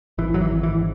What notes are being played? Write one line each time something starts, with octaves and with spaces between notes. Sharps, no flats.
G#1 E3
G#1 F#3
E3
G#1
E3
G#2